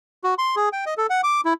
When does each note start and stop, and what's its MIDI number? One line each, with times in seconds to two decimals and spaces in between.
0.24 0.34 66
0.38 0.55 84
0.56 0.69 68
0.73 0.85 79
0.86 0.94 75
0.98 1.07 69
1.10 1.21 78
1.23 1.41 86
1.45 1.54 64